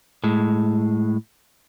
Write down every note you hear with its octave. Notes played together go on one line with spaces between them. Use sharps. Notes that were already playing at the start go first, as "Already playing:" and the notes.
A2 G#3